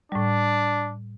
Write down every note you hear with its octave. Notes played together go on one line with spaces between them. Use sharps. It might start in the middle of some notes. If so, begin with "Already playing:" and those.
A2 G3 D4